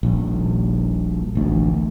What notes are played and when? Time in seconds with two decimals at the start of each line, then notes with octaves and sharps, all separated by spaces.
0.03 D#1 A#1
1.35 A1 D2